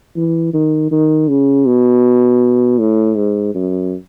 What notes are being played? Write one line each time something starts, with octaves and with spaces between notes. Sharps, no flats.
E3
D#3
D#3
C#3
B2
A2
G#2
F#2